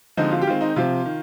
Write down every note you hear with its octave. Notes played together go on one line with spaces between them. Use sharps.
D3 F3 G#3 C4 D#4
F4
G4
D#3 G#3 C4 F4
D#4
C3 F3 C4 F4
D#3